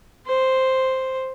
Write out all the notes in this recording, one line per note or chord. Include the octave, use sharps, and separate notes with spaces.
C5